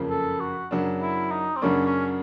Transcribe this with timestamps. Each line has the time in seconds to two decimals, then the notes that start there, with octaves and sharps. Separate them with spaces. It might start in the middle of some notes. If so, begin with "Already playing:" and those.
Already playing: F#1 F2 C#3 F3 A#3
0.10 A4
0.40 F#4
0.71 F#2 C#3 F#3 A#3 D4
1.02 E4
1.31 D#4
1.56 C4
1.62 F#2 C#3 F#3 A#3 C#4 D4
1.86 C#4